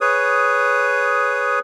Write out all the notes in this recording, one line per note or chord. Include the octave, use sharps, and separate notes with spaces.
G#4 B4 C#5 D#6